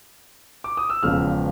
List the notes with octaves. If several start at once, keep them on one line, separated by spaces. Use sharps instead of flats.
D6
D#6
E6
E1 E2 C#3 F3 F6